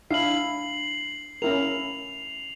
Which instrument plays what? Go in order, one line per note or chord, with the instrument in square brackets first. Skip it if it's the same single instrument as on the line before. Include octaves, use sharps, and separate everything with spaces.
[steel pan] D4 E4 F5 [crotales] C7 F#7
[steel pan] C#4 E4 A#4 [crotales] F7